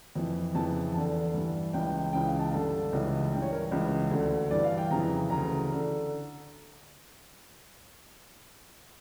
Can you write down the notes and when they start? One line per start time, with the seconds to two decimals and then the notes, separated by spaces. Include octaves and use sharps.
0.15 F2 E3
0.55 F2 C#3 E3 A5
0.94 E2 D3 A5
1.34 G2 E3
1.73 C#2 C#3 E3 G5
2.13 C#2 C#3 E3 G5
2.27 F5
2.39 A5
2.53 G2 D3 A5
2.93 C#2 C#3 E3
3.32 G2 E3 G5
3.42 C#5
3.52 A#4
3.71 C#2 C#3 E3
4.11 D2 D3
4.51 G2 E3 D5
4.64 F5
4.78 G5
4.91 F2 C#3 E3 A#5
5.30 D2 C#3 E3 A#5
5.72 D3